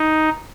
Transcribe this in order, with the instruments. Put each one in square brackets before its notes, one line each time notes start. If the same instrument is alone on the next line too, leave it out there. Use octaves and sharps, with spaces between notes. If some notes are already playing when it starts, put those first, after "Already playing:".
Already playing: [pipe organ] D#4